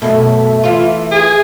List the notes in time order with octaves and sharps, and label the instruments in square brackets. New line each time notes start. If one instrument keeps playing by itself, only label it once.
[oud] F#2 B2 [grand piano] A3 [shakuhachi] E5
[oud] E3 F4
[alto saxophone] G#4